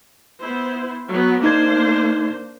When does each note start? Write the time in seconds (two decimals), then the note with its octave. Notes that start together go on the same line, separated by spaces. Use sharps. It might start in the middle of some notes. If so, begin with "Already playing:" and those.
0.41 B3 E4 C5
1.10 F#3 B3
1.44 A#3 D4 D#4 C5 G#6